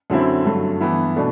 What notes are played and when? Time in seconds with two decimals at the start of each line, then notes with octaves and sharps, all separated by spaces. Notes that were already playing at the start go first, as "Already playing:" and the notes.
0.10 F#2 D3 F#3 C4 E4
0.45 G2 F#3 A3
0.80 G2 E3 B3 E4
1.16 B2 A3 D4